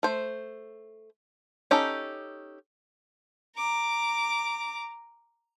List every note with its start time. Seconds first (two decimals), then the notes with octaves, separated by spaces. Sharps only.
0.03 A3 C5
1.71 C#4 D#4 G4 A4
3.56 A#5 D6